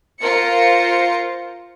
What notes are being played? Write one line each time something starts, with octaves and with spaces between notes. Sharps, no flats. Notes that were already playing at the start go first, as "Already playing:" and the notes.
F4 A#4 C5 C#7